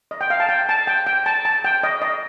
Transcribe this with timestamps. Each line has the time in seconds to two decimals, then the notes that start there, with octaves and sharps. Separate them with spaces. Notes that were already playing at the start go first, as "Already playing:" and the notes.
0.11 D#5
0.21 G5
0.30 F5
0.40 A5
0.49 G5
0.69 A5
0.87 G5
1.07 G5
1.26 A5
1.45 A5
1.65 G5
1.83 D#5
2.02 D#5